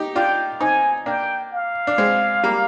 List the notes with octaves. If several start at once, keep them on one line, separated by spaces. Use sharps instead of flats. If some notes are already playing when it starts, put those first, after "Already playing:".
Already playing: D#4 G4
D4 F4 G5
C4 D#4 G#5
A#3 D4 G5
F5
D4
G#3 C4
G3 A#3